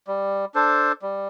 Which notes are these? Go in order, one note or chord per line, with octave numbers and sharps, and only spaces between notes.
G3
D4 A4 C5
G3